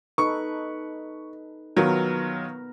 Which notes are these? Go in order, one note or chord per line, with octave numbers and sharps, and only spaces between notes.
D#4 A4 B4 C#6
D#3 F#3 B3 F4 A#4 B4